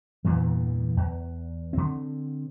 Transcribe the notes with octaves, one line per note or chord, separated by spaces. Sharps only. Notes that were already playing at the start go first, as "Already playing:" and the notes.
E2 G2 A#2 E3
E2
D3 C4